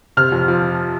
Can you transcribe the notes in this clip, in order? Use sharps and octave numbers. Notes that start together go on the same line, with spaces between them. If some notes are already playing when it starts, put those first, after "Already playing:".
C3 F6
F2
F3